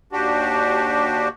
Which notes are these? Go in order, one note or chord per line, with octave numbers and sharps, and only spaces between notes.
D#2 D4 F#4 G4